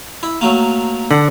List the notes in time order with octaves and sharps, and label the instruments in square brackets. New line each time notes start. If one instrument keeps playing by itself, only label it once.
[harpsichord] E4
F#3 A3 A#3
[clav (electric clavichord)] D3 [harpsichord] F#5